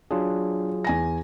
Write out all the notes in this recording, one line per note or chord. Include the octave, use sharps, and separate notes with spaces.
F#3 D4 F4 G#4
E2 G#5 A#6